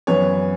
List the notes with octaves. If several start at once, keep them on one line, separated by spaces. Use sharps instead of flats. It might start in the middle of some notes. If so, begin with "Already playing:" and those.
F#2 E3 B3 C#5